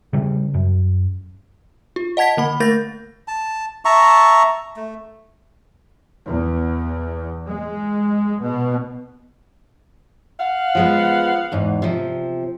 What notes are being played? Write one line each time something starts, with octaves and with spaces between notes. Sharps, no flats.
C#3 G3
F#2
F4
D#5 F#5 A5 G#6 B6
D3 A#3 B5
A3 A#4 G6 A6 A#6
A5
E5 A5 A#5 C#6
A3
E2
G#3
B2
F5 F#5
F3 G#3 B3
E2 G#2
C3 F3